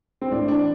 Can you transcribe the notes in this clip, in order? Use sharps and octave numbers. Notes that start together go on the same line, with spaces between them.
C4
A2 D4
E3 D4